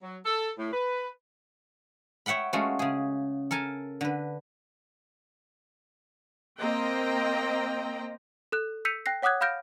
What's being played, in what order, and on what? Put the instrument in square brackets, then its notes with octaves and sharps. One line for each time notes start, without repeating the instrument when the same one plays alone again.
[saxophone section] F#3
A4
A2
B4
[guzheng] C#5 E5 F#5 G5 B5
G#3 A3 C#4 F4 F#4
C#3 G#4
A4 A#4 G#5 A5
D3 B4
[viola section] A#3 C4 C5 D#5 G5 A#5
[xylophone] A4 F#6
E6 G6 B6 C#7 D#7 F7
G5 F#6 A#6 C7
C#5 F#5 D6 D#6 F#6 G#6
F5 B5 F6 G6 A#6 D7